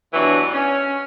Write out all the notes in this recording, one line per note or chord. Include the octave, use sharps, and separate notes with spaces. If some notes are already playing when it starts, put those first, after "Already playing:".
G2 B2 E3 F#3 D4 F#4
C#4